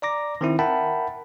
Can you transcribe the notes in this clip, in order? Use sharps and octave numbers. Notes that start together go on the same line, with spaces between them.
D5 A#5 D6 A#6
D#3 C4 E4
A#4 E5 F#5 G5 A5 B5